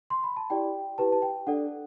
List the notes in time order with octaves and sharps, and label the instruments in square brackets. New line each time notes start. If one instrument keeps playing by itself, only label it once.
[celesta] C6
B5
A5
E4 G4 D5 G5
E4 G4 B4 A5
A5
G5
D4 A4 D5 F#5